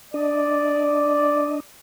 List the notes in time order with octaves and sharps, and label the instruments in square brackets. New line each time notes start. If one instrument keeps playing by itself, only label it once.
[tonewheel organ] D4 D#5 [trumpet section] D5